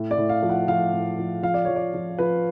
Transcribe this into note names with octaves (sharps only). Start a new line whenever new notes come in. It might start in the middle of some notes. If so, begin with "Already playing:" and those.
Already playing: A2
D5
A2
F5
F3
F#5
F3 F5
A2
F3
F3 F5
D5
F3 C#5
D5
F3
F3 B4